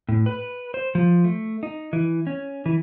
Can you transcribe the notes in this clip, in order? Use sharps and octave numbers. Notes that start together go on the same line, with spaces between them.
A2
B4
C5
F3
A3
D#4
E3
C#4
E3